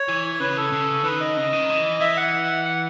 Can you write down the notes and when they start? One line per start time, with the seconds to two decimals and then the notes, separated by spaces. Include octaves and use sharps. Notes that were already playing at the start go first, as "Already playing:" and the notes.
Already playing: C#5
0.08 E3
0.40 C#3 B4
0.57 A4
0.72 C#3
1.04 D#3 B4
1.21 D#5
1.37 C#3
1.53 D#3
1.69 E3
2.00 E3 E5
2.17 F#5
2.65 F#5